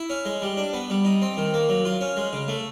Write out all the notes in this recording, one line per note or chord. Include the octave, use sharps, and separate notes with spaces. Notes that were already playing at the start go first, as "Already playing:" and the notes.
Already playing: E4
C#4
G#3
G3
D4
B3
G3
D#4
C4
D#3
A#3
F#3
F4
C#4
G#3
C#3
A3